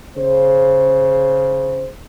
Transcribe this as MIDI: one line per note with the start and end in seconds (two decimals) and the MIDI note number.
0.16 1.89 49
0.16 1.89 72